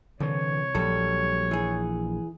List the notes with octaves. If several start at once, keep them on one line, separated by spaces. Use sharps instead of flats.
C2 D3 E3 C#5
A#1 F#3 G3 A4
E3 G#4